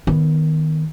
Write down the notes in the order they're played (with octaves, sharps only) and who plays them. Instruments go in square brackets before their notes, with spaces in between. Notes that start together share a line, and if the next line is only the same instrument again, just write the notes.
[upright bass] D#3 B3